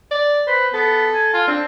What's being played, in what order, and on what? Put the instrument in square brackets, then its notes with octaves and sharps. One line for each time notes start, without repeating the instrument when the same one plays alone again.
[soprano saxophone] D5
[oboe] B4 [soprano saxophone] C5
[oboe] B3 [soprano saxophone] A4
[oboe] G#5
F4
[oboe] C4 [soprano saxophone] D4